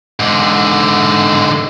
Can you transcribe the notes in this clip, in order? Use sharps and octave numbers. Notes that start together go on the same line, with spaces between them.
G#2 D3